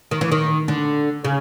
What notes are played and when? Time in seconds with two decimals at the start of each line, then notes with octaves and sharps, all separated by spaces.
0.11 D#3
0.21 E3
0.31 D#3
0.68 D3
1.24 C#3